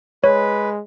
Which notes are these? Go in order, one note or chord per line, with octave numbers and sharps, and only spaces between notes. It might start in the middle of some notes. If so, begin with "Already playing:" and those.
G#3 B4 C#5